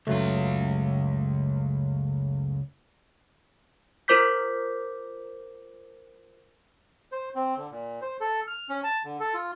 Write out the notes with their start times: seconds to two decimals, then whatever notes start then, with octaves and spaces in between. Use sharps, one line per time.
0.07 C#2 F#2 F#3 A3 F4
4.08 F4 A#4 C5 D6 G6 B6
7.12 C5
7.35 C4
7.57 D3
7.71 A#2
8.02 C5
8.21 A4
8.47 F6
8.70 C#4
8.84 A5
9.05 D3
9.20 A4
9.34 F4